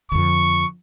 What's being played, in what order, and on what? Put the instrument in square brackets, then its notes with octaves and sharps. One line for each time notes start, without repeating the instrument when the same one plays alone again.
[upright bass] F2 D3 [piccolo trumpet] C#6